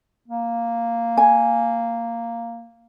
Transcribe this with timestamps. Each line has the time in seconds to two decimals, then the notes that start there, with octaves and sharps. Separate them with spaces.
0.28 A#3
1.17 G#5